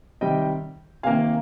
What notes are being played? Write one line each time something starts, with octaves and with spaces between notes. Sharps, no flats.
C3 D#3 G3 D#5 G5
C3 D#3 A#3 F5 G#5